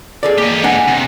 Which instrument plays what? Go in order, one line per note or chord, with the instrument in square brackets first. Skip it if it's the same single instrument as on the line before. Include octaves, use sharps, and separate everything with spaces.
[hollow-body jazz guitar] G#4 A4 D5
[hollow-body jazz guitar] A#3 [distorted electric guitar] G4 D#5
[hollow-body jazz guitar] D4 F#5 G#5
[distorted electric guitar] C3